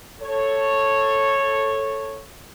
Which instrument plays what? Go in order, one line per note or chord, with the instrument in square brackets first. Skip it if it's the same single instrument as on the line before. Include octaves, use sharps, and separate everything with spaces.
[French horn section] A4 C#5